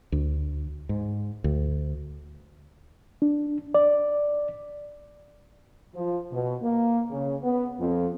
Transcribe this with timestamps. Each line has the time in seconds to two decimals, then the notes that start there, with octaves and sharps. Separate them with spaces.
0.12 D2
0.89 G#2
1.44 D2
3.22 D4
3.75 D5
5.95 F3
6.32 B2
6.62 A#3
7.10 C#3
7.42 B3
7.79 F2